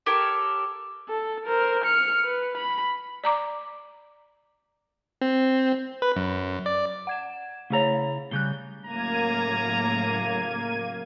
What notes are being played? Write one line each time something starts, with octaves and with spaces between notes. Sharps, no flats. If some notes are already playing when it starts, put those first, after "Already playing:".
G4 A4 A#4 C#5
A4
A#4 C5
F6 C#7
B4
B5
D5 A#5 D6
C4
B4
F#2
D5
F#5 G#6 E7
C#3 A3 E4 G#4 C#5 A#5
A2 C#3 G3 F#6 G6 G7
A2 C#3 F#3 A#3 A#5 G#6 D#7